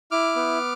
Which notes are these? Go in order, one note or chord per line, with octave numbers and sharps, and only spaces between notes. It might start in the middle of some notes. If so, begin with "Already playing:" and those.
E4 D6 F6
B3